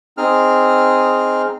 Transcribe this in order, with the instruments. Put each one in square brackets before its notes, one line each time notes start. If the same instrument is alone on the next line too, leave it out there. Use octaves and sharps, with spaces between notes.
[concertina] C4 D#4 G#4 F6